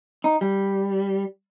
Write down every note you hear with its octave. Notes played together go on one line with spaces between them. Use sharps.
D#4
G3